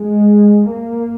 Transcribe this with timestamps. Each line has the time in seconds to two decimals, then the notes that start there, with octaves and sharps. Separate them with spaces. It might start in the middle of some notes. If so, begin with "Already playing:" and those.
Already playing: G#3
0.70 A#3